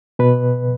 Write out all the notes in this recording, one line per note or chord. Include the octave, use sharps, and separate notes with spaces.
B2 B4